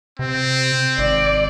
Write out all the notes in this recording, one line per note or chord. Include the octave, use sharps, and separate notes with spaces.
C3 C4
G#1 D5